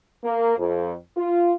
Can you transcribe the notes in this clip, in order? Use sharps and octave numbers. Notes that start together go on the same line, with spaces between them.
A#3
F2
F4